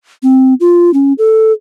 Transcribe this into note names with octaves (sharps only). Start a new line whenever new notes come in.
C4
F4
C#4
A4